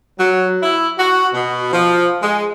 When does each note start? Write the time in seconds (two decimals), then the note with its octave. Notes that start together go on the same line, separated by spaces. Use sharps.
0.19 F#3
0.62 E4
0.98 F#4
1.33 B2
1.72 F3
2.22 G#3